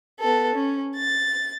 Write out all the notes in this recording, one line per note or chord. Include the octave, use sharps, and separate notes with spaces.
B3 A4
C#4
A6